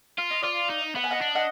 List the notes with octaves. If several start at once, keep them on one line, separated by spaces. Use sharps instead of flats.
F4 F5
D#5
F4 D5 F5
D#4
B3 F#5
G#5
D#5 F#5
D4
D#5 F#5